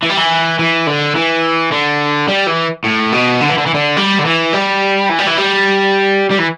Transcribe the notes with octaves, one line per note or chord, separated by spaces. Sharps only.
E3
G3
E3
E3
D3
E3
D3
G3
E3
A2
B2
D3
E3
D3
E3
D3
G3
D3
E3
G3
E3
G3
E3
G3
G3
E3